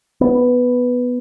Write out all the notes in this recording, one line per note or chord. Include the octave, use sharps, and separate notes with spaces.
B3